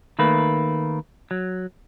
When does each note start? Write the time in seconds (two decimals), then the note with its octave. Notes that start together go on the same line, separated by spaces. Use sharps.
0.19 D#3 A3 A#3 B4
1.31 F#3